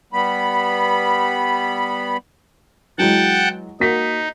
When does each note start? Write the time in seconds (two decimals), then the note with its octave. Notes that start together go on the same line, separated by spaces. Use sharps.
0.13 G3 B3 B5
2.98 E3 F#3 G#3 F#5 G5 A5
3.80 A#3 D#4 F#4 B6